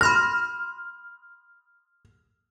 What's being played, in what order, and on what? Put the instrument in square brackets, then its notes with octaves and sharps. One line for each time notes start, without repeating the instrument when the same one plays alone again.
[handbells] B5 C6 A#6 [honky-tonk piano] F6